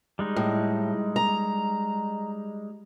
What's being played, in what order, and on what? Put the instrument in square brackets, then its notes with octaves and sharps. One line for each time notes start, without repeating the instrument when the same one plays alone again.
[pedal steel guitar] G3 G#3 D#4
[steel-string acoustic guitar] A2
A#5